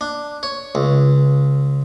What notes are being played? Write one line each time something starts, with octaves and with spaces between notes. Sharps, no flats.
D4
C#5
C#2